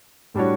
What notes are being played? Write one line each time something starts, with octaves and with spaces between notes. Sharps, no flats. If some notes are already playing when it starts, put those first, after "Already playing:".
A2 G3 D4 F#4 C#5